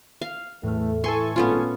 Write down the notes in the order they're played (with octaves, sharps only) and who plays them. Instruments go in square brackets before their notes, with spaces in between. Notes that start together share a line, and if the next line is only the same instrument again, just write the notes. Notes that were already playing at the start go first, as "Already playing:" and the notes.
[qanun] F5
[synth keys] E2 [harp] A2 F6 [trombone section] E3 A3
[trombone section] E3 [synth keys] A4 G#5 C#6 [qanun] C6
[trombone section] G#1 [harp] A#2 A3 [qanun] B3 C#4 F4